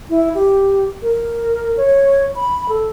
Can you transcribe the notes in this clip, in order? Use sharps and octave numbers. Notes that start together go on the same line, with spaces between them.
E4
G4
A#4
C#5
B5
A4